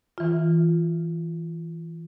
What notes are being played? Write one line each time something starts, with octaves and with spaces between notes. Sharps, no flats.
E3 F4